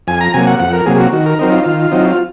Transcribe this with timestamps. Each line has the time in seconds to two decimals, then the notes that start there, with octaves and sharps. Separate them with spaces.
0.07 F2 G#5
0.21 A#5
0.34 C3 F#3 A#3 G#5
0.47 F#5
0.60 F2 F#5
0.73 A#4
0.86 C3 F#3 A#3 G#4
1.00 F#4
1.13 D#3 F#4
1.26 A#4
1.39 F#3 C4 D#4 A#4
1.52 F4
1.66 D#3
1.92 F#3 C4 D#4
2.05 F4